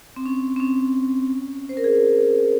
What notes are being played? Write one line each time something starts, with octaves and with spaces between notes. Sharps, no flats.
C4
C#4
C4
C#4
C5
A#4
G#4